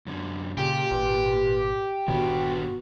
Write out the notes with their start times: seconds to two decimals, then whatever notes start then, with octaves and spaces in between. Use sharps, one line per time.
0.07 F#2 D3
0.57 A#2 C#3 G4
0.91 G#1 B4
2.08 G1 A#2 D3 D#3 B3 F#4